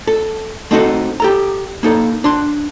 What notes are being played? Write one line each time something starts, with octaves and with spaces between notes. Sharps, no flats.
A4
A3 C4 D#4 F#4 G4 A4
G4 A4 A#5
A#3 D#4 A4
D4 C6